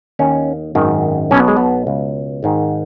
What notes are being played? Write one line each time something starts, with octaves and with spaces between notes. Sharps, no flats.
D#2 D#3 C#4
G#1 F#2 D#3
B1 B2 B3 C#4
G#3
B3
C#2 B2
G#1 G#2 D#3